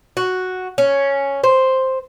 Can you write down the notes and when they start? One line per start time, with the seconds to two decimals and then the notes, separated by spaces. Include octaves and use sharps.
0.17 F#4
0.78 C#4
1.44 C5